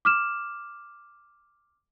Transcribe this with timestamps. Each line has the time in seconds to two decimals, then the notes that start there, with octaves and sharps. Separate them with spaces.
0.05 D6 F6 E7